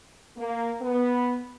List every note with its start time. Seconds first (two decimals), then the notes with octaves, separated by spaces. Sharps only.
0.37 A#3
0.82 B3